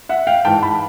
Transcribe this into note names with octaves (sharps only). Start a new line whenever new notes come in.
E5 F#5
F5 G5
G#2 E3 G5 A5
A5 B5